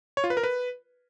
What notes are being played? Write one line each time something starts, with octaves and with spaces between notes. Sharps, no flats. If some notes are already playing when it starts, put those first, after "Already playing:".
C#5
F4
B4
A#4
B4